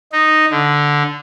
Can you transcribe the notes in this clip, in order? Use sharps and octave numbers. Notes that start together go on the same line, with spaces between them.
D#4
D3